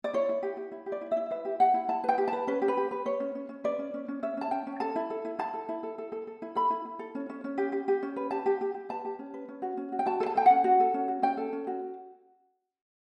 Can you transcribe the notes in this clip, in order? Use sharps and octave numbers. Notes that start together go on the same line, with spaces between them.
D5
E4 C#5
E4
G4
G4
E4
G4
D5
E4
E5
E4
B4 E5
G4
G4 F#5
E4
E4 A5
B4 G5
G4
A5
B4
C#4 B4
G4
B4
G4
B4
B4 C#5
C#4
C#4
C#4
B4 D5
C#4
C#4
C#4
C#4 E5
C#4 A5
C#4 G5
C#4
A4 A5
E4
A4
E4
E4 A5
A4
E4
A4
A4
A4
A4
E4
A4 B5
E4
E4
A4
C#4
C#4
C#4
G4
G4
G4
C#4
B4
G4 A5
G4
G4
G4
B4 A5
G4
C#4
B4
C#4
F#4
C#4
F#4
G5
F#4 A5
A4
A5
A4 G5
C#4 F#5
F#4
A4
C#4
F#4
C#4 G5
A4
C#4
F#4